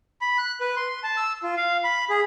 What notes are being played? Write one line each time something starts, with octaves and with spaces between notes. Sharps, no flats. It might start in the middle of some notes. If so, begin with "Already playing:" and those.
B5
F#6
B4
C6
A5
E6
F4
F5
B5
G#4